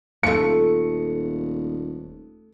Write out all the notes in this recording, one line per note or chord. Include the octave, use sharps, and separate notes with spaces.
D#1 A3 A#3 F4 C#7